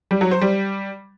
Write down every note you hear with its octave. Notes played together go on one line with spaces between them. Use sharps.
G3
F#3
C5
G3